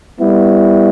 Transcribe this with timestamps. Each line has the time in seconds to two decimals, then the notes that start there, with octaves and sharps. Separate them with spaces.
0.18 G3 B3 E4